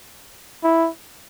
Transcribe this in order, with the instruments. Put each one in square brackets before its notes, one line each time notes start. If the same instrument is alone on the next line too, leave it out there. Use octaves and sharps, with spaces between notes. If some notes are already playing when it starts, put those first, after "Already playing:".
[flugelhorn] E4